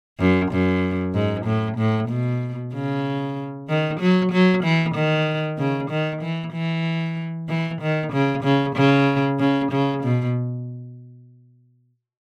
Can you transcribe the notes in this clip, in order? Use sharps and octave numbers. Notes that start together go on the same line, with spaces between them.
F#2
F#2
G#2
A2
A2
B2
C#3
D#3
F#3
F#3
E3
D#3
C#3
D#3
E3
E3
E3
D#3
C#3
C#3
C#3
C#3
C#3
B2